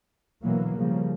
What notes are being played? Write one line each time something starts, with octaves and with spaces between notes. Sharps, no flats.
B2 D3 E3 F#3 A#3
C#3 F3 G3 A#3